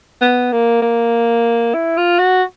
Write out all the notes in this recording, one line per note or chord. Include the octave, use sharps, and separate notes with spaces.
B3
A#3
A#3
E4
F4
F#4